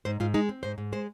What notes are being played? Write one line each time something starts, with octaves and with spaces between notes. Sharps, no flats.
G#2 C5
G#2 F4
G#3 D#4
C4
G#2 C5
G#2
G#3 C5